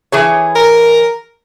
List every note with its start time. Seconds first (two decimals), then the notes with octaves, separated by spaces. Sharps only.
0.12 E3 G#4 C#5
0.55 A#4